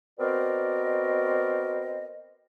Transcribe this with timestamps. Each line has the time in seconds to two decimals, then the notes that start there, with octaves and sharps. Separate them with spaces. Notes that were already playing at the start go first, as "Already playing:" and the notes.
0.20 B3 C4 F#4 A#4 D5 D#5